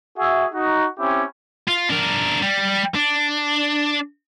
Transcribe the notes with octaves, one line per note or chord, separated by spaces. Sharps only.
F#4 G#4 E5
D#4 F#4
C4 C#4 E4 G4
F4
D4 A#4
G3
D4